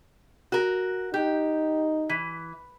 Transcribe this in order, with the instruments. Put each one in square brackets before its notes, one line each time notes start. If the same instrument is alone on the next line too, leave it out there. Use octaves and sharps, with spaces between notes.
[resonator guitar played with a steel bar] F#4 A#4
[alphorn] D#4 [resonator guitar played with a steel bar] G4
[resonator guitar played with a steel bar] E3